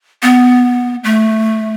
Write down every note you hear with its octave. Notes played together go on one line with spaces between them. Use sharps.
B3
A3